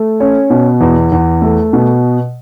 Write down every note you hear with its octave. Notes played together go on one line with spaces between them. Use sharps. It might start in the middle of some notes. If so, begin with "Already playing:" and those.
Already playing: A3
C#4
B2
E2
E2
A3
B2